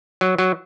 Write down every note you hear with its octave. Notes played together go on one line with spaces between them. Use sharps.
F#3
F#3